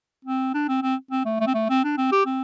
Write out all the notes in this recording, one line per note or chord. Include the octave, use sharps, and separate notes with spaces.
C4
D4
C4
C4
C4
A3
A3
C4
A3
C4
D4
C4
G4
C4